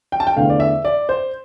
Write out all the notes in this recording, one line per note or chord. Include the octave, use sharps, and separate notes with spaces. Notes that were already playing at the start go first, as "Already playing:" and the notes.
G5
A5
G5
E2 D3 A3 F5
D5
E5
D5
C5